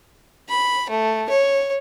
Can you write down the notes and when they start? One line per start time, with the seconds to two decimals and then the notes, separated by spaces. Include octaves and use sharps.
0.49 B5
0.90 A3
1.29 C#5